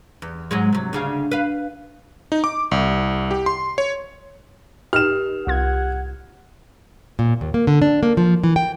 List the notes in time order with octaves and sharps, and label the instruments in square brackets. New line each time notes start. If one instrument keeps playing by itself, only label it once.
[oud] E2
G#2 F#3 G#3
C3 F#3
D2 C#3 F5
B4 F5
[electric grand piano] D#4
D6
C2
G4
C6
C#5
[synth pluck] D#4 [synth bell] G4 [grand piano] F6 E7
[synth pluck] C2 F4 G#6 [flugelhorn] F#5
[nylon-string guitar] A#2
D#2
A#3
D3
D4
A#3
F3
E3
G5